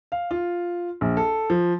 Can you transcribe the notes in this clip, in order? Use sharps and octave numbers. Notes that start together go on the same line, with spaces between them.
F5
F4
A#1
A4
F3